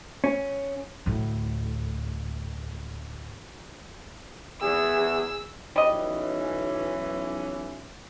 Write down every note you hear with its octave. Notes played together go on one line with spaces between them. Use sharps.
C#4
D2 A2
E2 G#4 E6
B1 E3 G3 C#4 D#5